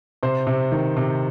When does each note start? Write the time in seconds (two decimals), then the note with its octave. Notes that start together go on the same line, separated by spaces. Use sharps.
0.23 C3 C5
0.47 C3
0.72 D#3
0.97 C3